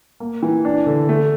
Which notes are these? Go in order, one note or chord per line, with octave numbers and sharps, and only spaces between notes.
A#3
E3
D4
D3
A3